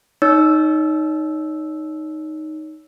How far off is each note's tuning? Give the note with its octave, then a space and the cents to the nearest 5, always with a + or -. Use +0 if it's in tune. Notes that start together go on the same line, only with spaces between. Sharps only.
D#4 +0 C#5 +30 E6 +0